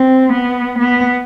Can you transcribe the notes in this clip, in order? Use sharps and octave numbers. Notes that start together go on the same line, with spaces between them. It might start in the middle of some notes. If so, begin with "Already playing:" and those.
Already playing: C4
B3
B3